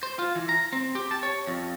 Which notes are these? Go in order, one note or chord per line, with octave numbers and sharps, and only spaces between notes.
C5
F4
E3
A#5
C4
G4
A5
C#5
F2